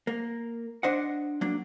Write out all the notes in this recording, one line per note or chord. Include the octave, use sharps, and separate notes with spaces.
A#3
D4 C5 D#5 F#5
F#3 A#3 D4